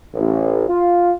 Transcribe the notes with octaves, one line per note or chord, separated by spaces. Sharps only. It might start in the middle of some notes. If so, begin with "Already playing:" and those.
A1
F4